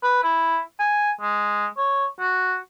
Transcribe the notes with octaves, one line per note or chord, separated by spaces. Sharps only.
B4
E4
G#5
G#3
C#5
F#4